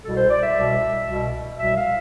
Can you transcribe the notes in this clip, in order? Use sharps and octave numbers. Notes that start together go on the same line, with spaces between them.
C2 B2 G3 A4
C5
D5
E5
C2 B2 G3
C2 B2 G3
C2 B2 G3 E5
F5